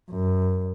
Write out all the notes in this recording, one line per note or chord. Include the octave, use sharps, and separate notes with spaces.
F#2